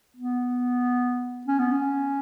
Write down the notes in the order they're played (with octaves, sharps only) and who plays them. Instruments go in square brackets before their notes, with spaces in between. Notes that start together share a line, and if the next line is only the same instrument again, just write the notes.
[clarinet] B3
C#4
B3
C#4